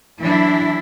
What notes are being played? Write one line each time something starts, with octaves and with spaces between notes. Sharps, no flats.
E3 F#3 D4 E4